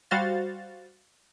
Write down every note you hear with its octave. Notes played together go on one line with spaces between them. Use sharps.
G3 F#4 C5 F5 A6